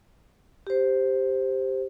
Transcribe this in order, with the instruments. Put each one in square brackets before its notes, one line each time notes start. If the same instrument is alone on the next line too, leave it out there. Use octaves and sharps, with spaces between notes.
[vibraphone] G4 C5